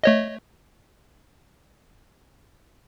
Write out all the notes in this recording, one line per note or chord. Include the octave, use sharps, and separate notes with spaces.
A3 C#5 D#5